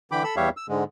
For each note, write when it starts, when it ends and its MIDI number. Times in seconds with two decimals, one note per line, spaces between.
0.11 0.23 50
0.11 0.23 52
0.11 0.23 79
0.11 0.23 83
0.11 0.23 86
0.24 0.35 69
0.24 0.35 83
0.24 0.35 88
0.36 0.49 40
0.36 0.49 55
0.36 0.49 67
0.36 0.49 73
0.36 0.49 76
0.36 0.49 77
0.57 0.66 88
0.69 0.84 44
0.69 0.84 50
0.69 0.84 56